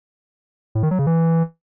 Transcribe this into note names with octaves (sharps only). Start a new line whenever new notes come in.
A2
D#3
F#3
C#3
E3